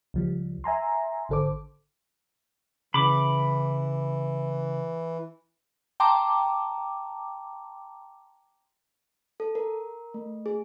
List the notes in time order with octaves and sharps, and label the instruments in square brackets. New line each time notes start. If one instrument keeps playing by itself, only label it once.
[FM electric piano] C#2 F3 G3
E5 G#5 A#5 C6
G#1 D3 A4 C5 D6
[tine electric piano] C#3 [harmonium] E3 [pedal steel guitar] B5 D6
[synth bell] G5 A5 A#5 C6 D6
[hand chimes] A4
A#4
A3
G#4